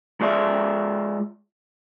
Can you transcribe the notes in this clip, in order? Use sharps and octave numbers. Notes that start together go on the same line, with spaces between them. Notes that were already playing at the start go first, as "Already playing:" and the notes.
G#3 F4 D5 E5